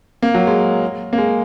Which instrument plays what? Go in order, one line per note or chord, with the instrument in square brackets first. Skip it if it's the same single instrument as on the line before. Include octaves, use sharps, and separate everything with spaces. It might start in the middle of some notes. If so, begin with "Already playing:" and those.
[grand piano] A#3
F#3
G#3
A#3
G#3